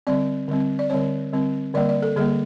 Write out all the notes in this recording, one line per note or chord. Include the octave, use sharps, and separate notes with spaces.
D3 G3 C4 D5
D3 G3 C4
D5
D3 G3 C4 C#5
D3 G3 C4
D3 G3 A#3 D5
D5
A4
D3 G3 A#3 G#4